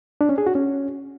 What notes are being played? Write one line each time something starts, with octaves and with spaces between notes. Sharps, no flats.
D4
C#4
G#4
F#4
C#4